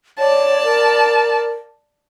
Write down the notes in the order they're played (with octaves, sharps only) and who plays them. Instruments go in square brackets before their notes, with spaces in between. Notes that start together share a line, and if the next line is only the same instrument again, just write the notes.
[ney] C#5 [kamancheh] D5 A5
[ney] A#4